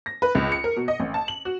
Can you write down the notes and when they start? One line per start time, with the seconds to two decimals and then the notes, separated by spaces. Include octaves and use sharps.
0.06 A#6
0.22 B4
0.35 C#2
0.52 C#7
0.64 A#4
0.77 B2
0.88 D#5
1.00 A1
1.14 A5
1.28 F#7
1.45 F#4